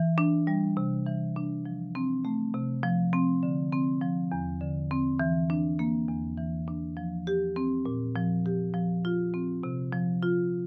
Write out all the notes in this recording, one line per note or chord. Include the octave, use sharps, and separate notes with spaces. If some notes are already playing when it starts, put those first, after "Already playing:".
Already playing: E3
D4
G3
C3
E3
D4
F3
C4
A3
C3
F3
C4
D3
C4
F3
E2
D3
C4
E3
D4
A#3
E2
E3
D4
F3
G4
C4
A#2
F3
G4
F3
F4
C4
C3
F3
F4